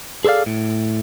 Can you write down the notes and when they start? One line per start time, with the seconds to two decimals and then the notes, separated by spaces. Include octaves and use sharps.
0.25 G#4 A4 B4 D5 F5
0.46 A2